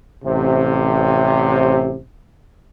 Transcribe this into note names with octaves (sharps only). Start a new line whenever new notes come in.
A1 C3